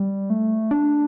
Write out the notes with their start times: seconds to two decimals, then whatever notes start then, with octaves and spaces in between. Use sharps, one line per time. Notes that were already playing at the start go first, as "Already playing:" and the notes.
Already playing: G3
0.30 A3
0.71 D4